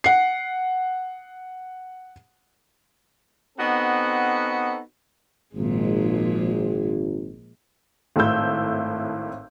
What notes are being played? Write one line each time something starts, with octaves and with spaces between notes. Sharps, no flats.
F#5 C7
B3 C4 D#4 F#4 A4
G#1 A#2 F3 G#3
G#1 A2 A4 E5 E6 G6